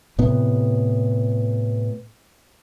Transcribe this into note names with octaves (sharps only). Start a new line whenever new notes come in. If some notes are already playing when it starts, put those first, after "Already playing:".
A2 C3 B3